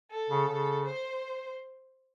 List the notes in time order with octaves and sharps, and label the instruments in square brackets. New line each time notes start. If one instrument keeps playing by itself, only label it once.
[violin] A4
[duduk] C#3
C#3
[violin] C5